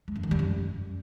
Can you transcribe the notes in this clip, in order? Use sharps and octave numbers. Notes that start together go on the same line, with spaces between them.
G#3
F#2
D#3
G3
F#2